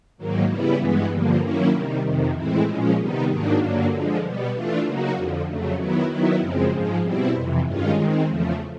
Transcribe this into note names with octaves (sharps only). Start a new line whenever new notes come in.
G#2 D#3 F#3 A#3
C#3 E3 G3 B3 E4
G2 E3 G#3 B3
G2 D3 F3 A#3
D#3 F#3 A#3 C#4 E4
C3 D#3 G3
F2 C3 D#3
A2 E3 G#3 C4 E4
A#2 F3 G#3 C#4
C3 D#3 G3 B3 D#4
G#2 D#3 F#3 A#3 D4
G2 D3 F#3 A#3
D3 F3 G#3
B2 G3 B3
E3 A3 D4 F4
C#3 F#3 A#3 D#4 F#4
F2 D3 F3
F2 C#3 F#3 A3
D#3 F#3 B3 E4
D#3 F#3 B3 E4
F#2 C#3 F3 G#3 C4
G#2 F3 G#3
B2 G3 C4 E4
F2 C3 E3
G2 D#3 G#3 C#4 F4
D#3 G#3 C4
E2 C#3 F3 A3